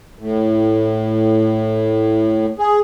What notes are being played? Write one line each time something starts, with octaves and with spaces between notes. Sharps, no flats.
A2
G#4